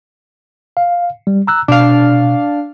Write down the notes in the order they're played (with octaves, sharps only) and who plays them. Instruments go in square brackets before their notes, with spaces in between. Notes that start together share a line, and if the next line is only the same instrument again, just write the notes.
[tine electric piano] F5
G3
A#5 E6 F#6
[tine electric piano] B2 [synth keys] D4 F5